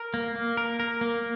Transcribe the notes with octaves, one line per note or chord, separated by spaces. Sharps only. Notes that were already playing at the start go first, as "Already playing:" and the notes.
Already playing: A#4
A#3
A#3
A#4
A#4
A#3